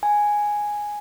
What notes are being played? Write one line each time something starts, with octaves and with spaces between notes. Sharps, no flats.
G#5